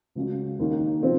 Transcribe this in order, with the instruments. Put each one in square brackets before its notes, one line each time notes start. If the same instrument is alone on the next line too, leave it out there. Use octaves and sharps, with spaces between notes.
[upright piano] C#2 C#3 F#3 C#4
D#2 D#3 A#3 C#4
C3 F3 C4